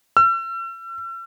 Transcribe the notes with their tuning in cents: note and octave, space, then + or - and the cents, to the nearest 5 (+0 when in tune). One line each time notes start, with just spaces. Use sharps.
E6 +40